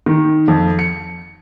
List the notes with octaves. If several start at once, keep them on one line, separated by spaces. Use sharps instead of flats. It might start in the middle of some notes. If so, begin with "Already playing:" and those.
D#3
F2
C#7